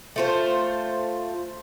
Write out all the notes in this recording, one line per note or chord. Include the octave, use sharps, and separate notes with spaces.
A3 F4 C5